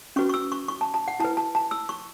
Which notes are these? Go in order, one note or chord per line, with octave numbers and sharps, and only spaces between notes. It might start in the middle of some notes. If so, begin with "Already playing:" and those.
C#4 F#4 B4 C#6
C#6
E6
C#6
C#6
A5
A5
F#5
E4 B4 A5
A5
A5
E6
C#6